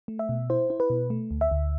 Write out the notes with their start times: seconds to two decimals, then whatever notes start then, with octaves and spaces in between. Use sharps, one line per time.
0.08 A3
0.19 E5
0.29 B2
0.50 E4 C5
0.70 E4
0.80 B4
0.90 B2
1.10 A3
1.31 D2
1.41 E5
1.51 D2